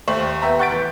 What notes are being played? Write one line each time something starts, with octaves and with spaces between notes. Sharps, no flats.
D#2 A3 C5 C#6 F#7
B3 G4 E5 A#5
F#5 C#6 G6 A6 B6 D7
E3